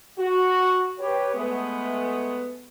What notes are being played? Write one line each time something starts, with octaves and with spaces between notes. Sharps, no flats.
F#4
G4 B4 C#5
G#3 A3 B3